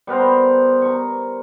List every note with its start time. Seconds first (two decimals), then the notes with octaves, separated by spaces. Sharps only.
0.07 G3 B3 A#4 C5
0.82 A#5 C#6